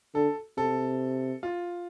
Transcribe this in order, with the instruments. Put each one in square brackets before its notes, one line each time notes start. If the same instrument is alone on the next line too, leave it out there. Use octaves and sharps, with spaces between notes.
[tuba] D3 [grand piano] A4
[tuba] C3 [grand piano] A4
[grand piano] F4